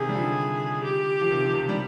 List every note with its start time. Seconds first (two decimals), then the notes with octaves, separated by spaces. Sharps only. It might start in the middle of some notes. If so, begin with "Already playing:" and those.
Already playing: C3 D#3 G#4
0.09 G3
0.15 D3 F3
0.84 G4
1.21 F3
1.31 C3 D#3
1.44 F3
1.54 C3 D#3
1.69 G3